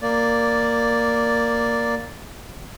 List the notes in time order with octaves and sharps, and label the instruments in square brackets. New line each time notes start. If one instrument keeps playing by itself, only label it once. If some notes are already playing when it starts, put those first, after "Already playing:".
[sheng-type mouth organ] A#3 D5